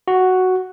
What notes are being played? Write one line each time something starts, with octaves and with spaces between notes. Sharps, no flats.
F#4